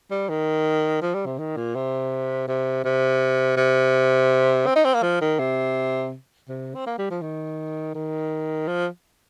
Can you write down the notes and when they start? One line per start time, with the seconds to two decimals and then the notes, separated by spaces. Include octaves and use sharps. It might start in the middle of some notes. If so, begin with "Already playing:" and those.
0.11 G3
0.29 D#3
1.02 F3
1.14 G3
1.26 C3
1.38 D#3
1.56 A#2
1.75 C3
2.48 C3
2.84 C3
3.57 C3
4.66 C4
4.76 D#4
4.85 C4
4.94 A#3
5.03 F3
5.21 D#3
5.39 C3
6.48 C3
6.75 C4
6.86 A#3
6.98 G3
7.10 F3
7.22 D#3
7.94 D#3
8.68 F3